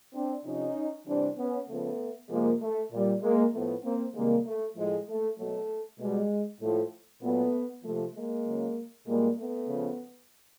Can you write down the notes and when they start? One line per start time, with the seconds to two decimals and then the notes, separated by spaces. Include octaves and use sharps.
0.15 C4 D4
0.45 C3 F3 C#4 D#4
1.07 C3 E3 G3 C4 D4
1.37 B3 C#4
1.68 C#3 F3 A3 B3
2.30 C3 F3 G#3 A#3
2.61 A3
2.92 A#2 G3
3.22 G#3 A#3
3.53 A2 F3 A3 B3
3.83 A#3 C4
4.15 C3 D#3 G3 G#3 A#3
4.45 A3
4.76 A2 F3 G#3
5.07 A3
5.38 B2 F#3 A3
5.99 B2 G3 G#3
6.60 A2 F3 A3
7.22 A#2 F#3 A3 B3
7.84 C3 F3 A3
8.14 G#3 A#3
8.45 C#3 F#3
9.07 A#2 G3 G#3 A#3
9.37 A3 B3
9.68 C#3 F3